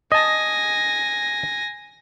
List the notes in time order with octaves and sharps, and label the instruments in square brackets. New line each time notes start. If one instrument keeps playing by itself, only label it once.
[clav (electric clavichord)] D#5 A5 [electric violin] G#5 A#6